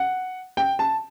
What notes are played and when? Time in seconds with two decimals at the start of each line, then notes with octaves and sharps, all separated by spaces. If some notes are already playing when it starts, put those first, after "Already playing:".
Already playing: F#5
0.57 G5
0.79 A5